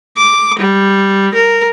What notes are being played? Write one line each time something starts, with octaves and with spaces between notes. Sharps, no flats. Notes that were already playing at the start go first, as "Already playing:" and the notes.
D6
G3
A#4